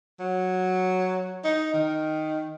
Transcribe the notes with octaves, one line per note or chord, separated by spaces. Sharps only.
F#3
D#4
D#3